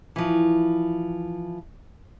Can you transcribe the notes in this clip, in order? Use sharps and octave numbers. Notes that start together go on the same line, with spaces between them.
E3 F3